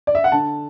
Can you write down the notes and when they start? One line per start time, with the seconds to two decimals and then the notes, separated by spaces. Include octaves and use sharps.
0.07 D5
0.15 E5
0.24 F#5
0.32 D3 A5